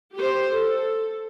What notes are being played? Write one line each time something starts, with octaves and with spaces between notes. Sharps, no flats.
G4 C5
A4